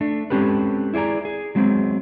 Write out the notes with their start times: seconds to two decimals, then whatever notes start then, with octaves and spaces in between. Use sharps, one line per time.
0.01 A3 D4
0.30 G#3 C4 C#4 G4 A4 B4
0.94 E4 G#4 D5 G#5 A#5
1.25 G#4
1.55 F#3 G#3 B3 C4